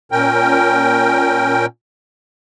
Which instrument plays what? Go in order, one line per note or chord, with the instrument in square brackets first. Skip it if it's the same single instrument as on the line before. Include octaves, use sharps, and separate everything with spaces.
[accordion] A#2 C#4 A#4 G5